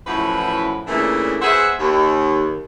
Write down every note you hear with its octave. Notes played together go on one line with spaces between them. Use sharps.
F#2 A2 E3 F3 F#4 B4
A#2 C#3 E3 A3 A#3 D4
B2 G#4 C5 E5 F#5
D#2